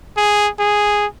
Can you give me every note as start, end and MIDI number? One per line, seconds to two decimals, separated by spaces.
0.17 0.49 68
0.59 1.06 68